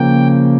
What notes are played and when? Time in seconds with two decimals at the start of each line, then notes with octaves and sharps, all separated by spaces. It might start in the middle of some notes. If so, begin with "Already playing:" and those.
Already playing: C#3 F3 A#3 G5